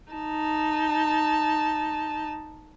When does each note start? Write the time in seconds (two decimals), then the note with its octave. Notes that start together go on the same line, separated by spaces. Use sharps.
0.12 D#4 A5